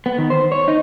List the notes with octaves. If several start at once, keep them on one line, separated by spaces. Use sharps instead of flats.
B3
D#3
C5
C#5
D#4